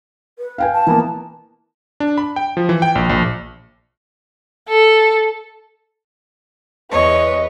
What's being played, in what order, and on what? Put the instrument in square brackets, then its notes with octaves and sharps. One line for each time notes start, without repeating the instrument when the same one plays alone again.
[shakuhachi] B4
[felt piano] F5 G5 G#5
[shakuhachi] A5
[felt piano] E3 A#3 B3
[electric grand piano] D4
B5
G5
F3
E3
G5
A#1
A#1
[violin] A4
[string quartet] E2 C#5 [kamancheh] B4 D#5